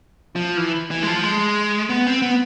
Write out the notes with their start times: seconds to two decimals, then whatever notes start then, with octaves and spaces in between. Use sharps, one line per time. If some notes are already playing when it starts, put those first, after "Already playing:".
0.36 F3
0.57 E3
0.91 E3
1.03 G#3
1.07 F3
1.24 G#3
1.89 B3
2.07 C4
2.22 B3